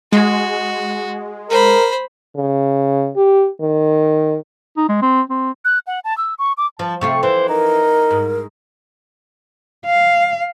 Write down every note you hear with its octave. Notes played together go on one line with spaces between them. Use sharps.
G#3 F#4
A#4 C5 B5
C#3
G4
D#3
D#4
G#3
C4
C4
F#6
F#5
A5
E6
C#6
D6
F3 A5
C3 A3 F4 C#6
E3 C5
D#4 A#4
G#2
F5